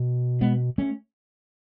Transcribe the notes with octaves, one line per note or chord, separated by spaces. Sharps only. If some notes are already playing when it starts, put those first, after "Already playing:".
Already playing: B2
G#3 B3
A3 C#4